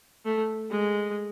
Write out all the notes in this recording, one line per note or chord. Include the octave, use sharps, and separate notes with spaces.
A3
G#3